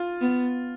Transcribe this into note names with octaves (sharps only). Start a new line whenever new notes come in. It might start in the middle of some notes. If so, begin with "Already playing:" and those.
Already playing: F4
B3